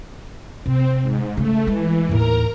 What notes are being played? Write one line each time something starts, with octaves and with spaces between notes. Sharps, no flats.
C3 C4
G#2
C#3 A3
E3 G#3
D#2 A2 A#4 A#5